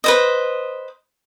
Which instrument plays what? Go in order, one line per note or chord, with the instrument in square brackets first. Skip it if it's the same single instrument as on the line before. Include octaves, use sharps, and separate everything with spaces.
[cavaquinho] B4 C5 D#5